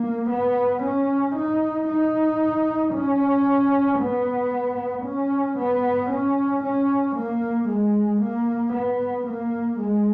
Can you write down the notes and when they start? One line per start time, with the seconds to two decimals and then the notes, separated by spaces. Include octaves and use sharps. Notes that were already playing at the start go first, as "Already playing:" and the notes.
Already playing: A#3
0.30 B3
0.83 C#4
1.35 D#4
1.88 D#4
2.94 C#4
4.00 B3
5.05 C#4
5.58 B3
6.11 C#4
6.63 C#4
7.16 A#3
7.69 G#3
8.22 A#3
8.74 B3
9.27 A#3
9.80 G#3